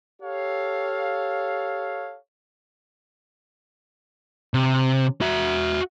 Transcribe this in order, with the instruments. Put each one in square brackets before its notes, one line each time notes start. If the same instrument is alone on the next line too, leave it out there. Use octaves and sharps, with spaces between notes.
[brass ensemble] G4 A4 C#5 F5
[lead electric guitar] C3
F#4 E5